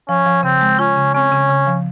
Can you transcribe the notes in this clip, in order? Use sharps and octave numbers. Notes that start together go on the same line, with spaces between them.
F3 C#4
F3
C#3 C4
G#3
C#4 F4
C#3
C4 C#4
C#3
C#3
F3